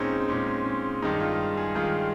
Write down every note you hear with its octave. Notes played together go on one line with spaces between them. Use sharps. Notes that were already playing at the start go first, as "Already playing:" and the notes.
Already playing: A#2 G#3 C4 C#4 D#4
A#2 G#3 C#4
C#4
G2 D#3 G#3 D#4
F4
G#4
G2 D#3 G#3 F4